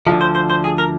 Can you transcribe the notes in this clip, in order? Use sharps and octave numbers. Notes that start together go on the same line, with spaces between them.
D2 D3 F3
C5
C5
C5
G#4
A#4